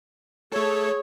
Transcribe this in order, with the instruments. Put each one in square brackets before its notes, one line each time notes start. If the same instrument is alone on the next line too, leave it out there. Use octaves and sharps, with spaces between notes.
[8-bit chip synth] A3 A4 [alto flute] G#4 [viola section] C#5